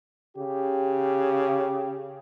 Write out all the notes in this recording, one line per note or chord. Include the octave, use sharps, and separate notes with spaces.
C#3 G4